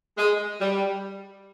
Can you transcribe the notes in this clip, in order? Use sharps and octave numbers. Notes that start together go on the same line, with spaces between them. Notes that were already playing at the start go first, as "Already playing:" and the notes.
G#3
G3